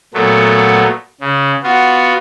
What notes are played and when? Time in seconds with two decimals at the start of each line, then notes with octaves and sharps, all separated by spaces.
0.14 A#2 F#3 A3 B3
1.21 C#3
1.63 B3 F4 F#4